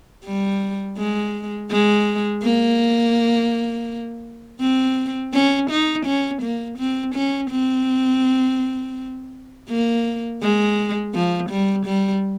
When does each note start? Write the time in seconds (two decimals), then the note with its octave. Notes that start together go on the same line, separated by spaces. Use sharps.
0.25 G3
0.98 G#3
1.71 G#3
2.43 A#3
4.60 C4
5.34 C#4
5.70 D#4
6.06 C#4
6.42 A#3
6.78 C4
7.15 C#4
7.51 C4
9.69 A#3
10.42 G#3
11.14 F3
11.50 G3
11.86 G3